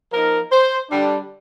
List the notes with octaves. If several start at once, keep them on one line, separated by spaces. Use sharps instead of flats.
F3 A#3 D#4 A#4
C5
D3 G3 D4